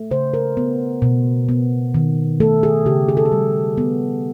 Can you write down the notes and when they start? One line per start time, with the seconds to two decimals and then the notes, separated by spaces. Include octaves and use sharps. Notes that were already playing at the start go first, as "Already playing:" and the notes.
Already playing: A3
0.11 C#3 C5
0.34 A#4
0.57 B3
1.02 B2
1.49 B3
1.94 D#3
2.40 A3 A4
2.63 G#4
2.86 C#3 G4
3.09 G#4
3.17 A4
3.25 G#4
3.32 G3
3.78 B3